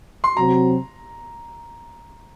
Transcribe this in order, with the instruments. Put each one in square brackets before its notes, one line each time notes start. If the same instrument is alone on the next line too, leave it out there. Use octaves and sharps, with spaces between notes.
[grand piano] C6
[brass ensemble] C3 F#3 C4 F#4 [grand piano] A#5